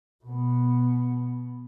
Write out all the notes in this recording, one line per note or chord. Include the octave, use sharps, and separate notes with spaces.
B2 B3